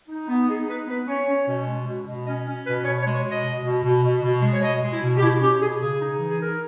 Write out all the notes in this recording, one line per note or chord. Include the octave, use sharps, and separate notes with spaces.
D#4
B3
D#4 G#4
D#4 B4
B3 B4
C#4 C#5
C#4
B2
G#3
B2
B2
C#4 D#5
C#4
B2 B4
B2 C#5
C#5
G#3
C#5
B2
D#5
B2
B2
B2
B2
B2
G#3
C#5
B2 D#5
G#3
E4
B2
G4
B2 E4
C#4 G4
B2 G#4
C#3 G#4
D#4
E3
G#4
D#4 A#4